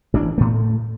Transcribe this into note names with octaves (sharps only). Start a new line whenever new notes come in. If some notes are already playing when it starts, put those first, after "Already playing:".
A1 E3 C#4 D4
A2 A3